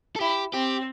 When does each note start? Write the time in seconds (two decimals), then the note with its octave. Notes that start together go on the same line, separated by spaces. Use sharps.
0.16 A4
0.20 E4 G4
0.53 C4 G4